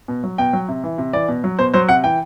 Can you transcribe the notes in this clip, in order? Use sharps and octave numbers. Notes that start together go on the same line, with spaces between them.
B2
F#3
B2 G5
F#3
C3
E3
C3
E3 D5
B2
F#3
B2 C5
F#3 C5
C3 F#5
E3 G5